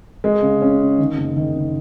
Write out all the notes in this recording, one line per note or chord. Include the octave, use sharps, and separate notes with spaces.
G#3
C#3
C#4
C#3
D#3
F#1
D#3
F#1